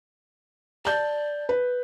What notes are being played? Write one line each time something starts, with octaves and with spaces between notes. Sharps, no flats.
D5 A5 G6
B4